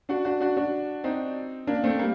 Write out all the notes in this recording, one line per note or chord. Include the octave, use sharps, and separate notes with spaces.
D4 F#4
D4 F#4
D4 F#4
D4 F#4
C4 D#4
A#3 D4
A3 C4
G3 A#3